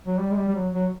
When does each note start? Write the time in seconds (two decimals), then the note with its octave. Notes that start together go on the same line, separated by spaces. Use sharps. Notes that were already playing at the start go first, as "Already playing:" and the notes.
0.07 F#3
0.19 G3
0.31 G#3
0.37 G3
0.48 G3
0.55 F#3
0.73 F#3